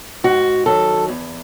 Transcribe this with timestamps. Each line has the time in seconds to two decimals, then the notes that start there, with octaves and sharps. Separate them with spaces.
0.24 G#2 F#4
0.66 D#3 F#3 A4
1.08 E2